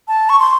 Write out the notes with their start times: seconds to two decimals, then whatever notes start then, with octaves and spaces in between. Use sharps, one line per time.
0.08 A5
0.29 C#6
0.40 C6